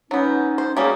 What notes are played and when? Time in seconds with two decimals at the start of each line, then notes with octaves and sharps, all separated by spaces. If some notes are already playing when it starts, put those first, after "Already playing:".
0.11 F#3 B3 C#4 D#4
0.58 C5
0.77 G3 A#3 C#4 F#4 G#4